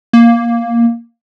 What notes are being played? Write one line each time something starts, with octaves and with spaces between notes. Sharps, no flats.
A#3